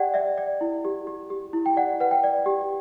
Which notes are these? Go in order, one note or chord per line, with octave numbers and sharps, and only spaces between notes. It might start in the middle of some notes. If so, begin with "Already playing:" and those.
Already playing: G4 D5 F#5 G5
D5 E5
D5
E4
G4
G4
G4
E4
G5
D5 F#5
B4 F#5
G5
D5
G4